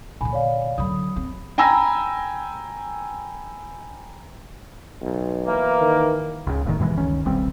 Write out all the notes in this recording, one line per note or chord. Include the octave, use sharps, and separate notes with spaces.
A#2 D3 G#5 B5
C#5 D5 F5
D3 F#3 B5 D#6
C4
G5 G#5 A#5 B5 E6 A#6
B1
E3 A#3
D#3
C#2 C#3
E1 A2 D#3
G2 B2 E3 G#3
F#1 C#2 D#3 C#4
D#1 B1 G3 C4